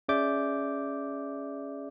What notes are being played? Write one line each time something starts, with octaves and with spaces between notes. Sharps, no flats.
C#4 G#4 D5 E5 D6 G6